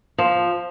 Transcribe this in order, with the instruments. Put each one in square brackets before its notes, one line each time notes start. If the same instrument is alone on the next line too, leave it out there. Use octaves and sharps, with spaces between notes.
[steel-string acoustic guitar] F3